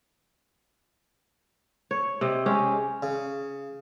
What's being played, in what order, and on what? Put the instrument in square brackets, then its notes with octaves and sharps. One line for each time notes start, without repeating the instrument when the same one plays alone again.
[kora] C#5
C3 D#5
G#3 C#4 G4
[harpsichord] C#3